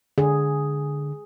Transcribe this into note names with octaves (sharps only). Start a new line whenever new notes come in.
D3 G#4